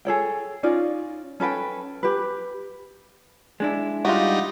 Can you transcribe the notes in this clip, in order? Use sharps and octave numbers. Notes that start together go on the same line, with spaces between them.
G#4 A4 C#5 G5
C#4 D#4 F4 D5
C#4 A4 B4 G5
G4 B4
G#3 D4 E4
G3 D#4 F4 F#4